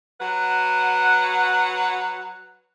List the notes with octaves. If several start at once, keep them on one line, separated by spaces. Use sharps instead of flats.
F#3 B4 F#5